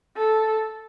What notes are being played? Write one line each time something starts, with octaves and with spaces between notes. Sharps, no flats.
A4